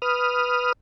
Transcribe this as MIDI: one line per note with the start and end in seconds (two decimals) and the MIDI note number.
0.02 0.73 71
0.02 0.73 87
0.02 0.73 89